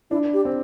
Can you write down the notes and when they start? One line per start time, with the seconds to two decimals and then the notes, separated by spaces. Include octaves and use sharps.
0.11 D4 E4
0.34 G4
0.45 C4